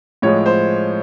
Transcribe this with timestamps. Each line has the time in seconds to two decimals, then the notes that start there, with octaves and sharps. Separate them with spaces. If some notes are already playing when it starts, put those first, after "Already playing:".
0.22 A2 F3 G#3 C#5
0.46 C5